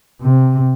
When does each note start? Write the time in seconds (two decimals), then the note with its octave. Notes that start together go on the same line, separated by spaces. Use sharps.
0.22 C3